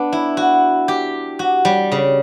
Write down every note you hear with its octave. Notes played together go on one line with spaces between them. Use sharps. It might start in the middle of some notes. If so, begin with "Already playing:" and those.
Already playing: B3 D4
E4
F#4
G4
F#4
G3
C#3